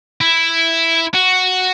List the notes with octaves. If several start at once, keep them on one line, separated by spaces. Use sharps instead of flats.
E4
F#4